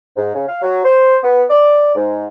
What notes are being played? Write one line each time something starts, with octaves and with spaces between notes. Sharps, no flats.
G#2
C#3
F5
F#3
C5
B3
D5
G#2